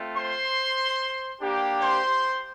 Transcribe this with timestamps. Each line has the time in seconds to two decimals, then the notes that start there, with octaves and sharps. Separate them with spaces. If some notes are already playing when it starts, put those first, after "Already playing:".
Already playing: A3 C4 F4
0.16 C5 C6
1.41 A#3 D4 G4
1.81 C5 C6